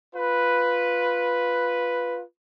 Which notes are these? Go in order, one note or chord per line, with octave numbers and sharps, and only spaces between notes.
F4 B4